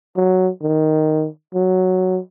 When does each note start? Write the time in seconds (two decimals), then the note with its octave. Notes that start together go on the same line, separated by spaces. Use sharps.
0.17 F#3
0.62 D#3
1.54 F#3